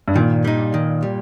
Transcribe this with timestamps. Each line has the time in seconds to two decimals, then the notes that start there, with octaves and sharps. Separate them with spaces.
0.08 G2
0.16 A#2 D#3
0.44 G3 D#4
0.74 D#3
1.03 G3